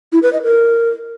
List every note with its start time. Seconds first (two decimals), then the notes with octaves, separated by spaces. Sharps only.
0.12 E4
0.23 B4
0.33 D#5
0.43 A#4